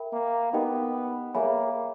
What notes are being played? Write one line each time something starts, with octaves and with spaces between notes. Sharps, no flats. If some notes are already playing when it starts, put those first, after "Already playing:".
Already playing: A#4 E5 G5 B5
A#3
B3 D#4 G4 A#4 D#5 G5
A#3 G#4 C#5 E5 G#5 B5